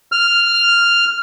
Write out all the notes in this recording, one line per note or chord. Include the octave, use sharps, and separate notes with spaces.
F6